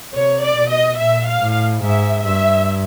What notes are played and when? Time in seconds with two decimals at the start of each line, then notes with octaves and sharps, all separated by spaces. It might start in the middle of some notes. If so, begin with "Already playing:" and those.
0.14 C3 C#5
0.43 D5
0.56 B2
0.70 D#5
0.99 A#2 E5
1.27 F5
1.41 A2
1.82 G#2 E5
2.25 G2 E5